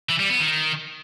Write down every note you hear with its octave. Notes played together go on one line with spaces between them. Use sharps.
E3
G3
B3
D#3